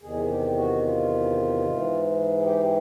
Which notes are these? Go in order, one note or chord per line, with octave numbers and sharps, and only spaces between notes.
E2 C3 D#3 G#4
G4
F#4
F4
G#2 E3
G#4
G4